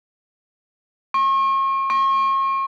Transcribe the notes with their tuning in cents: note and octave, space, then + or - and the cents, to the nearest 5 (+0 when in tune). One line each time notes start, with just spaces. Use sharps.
C#6 -40
C#6 -40